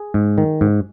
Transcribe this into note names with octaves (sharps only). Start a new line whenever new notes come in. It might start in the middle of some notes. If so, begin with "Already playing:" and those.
Already playing: G#4
G#2
D#3
G#2